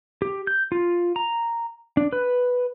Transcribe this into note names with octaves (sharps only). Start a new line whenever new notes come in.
G4
G6
F4
A#5
D4
B4